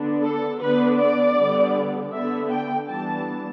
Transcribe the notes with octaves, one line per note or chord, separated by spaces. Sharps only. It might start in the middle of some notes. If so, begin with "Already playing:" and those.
Already playing: D3 B3 D4
A4
D3 B3 D4 B4
D5
D3 G3 B3
D3 B3 D4 E5
G5
E3 G3 B3 D4 A5